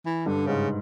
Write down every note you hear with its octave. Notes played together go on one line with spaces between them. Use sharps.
E3
G2 D3
G#2 C#3